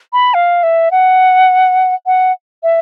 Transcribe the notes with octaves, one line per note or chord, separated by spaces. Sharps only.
B5
F5
E5
F#5
F#5
E5